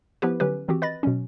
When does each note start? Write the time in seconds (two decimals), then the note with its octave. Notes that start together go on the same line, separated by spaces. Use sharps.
0.22 F3 B3 E4 G4 B4
0.40 D3 F#3 C#4 G4 B4
0.68 D#3 E3 C4 F#4 G4
0.82 B4 D#5 B5 A6 A#6
1.03 B2 F#3 C#4